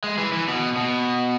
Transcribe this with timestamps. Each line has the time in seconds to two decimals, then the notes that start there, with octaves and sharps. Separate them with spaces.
0.04 G#3
0.18 E3
0.33 E3
0.48 B2
0.77 B2